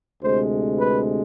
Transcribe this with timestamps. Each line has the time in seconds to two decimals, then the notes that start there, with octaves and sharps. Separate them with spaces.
0.23 D2 C3 G#3 C5
0.80 B4